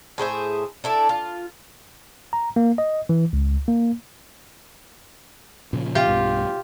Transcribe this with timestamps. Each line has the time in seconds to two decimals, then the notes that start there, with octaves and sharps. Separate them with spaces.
0.18 A2 G#4 C5 E5
0.84 D4 E4 A4
1.09 F4
2.33 A#5
2.56 A#3
2.78 D#5
3.09 E3
3.33 C#2
3.68 A#3
5.73 A#2 C#3 F3
5.95 F4 G4
6.08 B1 G2 B2